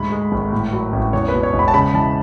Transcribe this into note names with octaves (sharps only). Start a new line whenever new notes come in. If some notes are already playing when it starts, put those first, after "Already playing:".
Already playing: D2 G#2 B5
G#3
G#1
A2
F#3
A1
E2 C#5
B4
B2
C#5
E1
B5
A5
C#3 B5
E3 A5